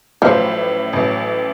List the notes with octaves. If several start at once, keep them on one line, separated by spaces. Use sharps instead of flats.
A1 A2 F3 F#3
A1 A2 F#3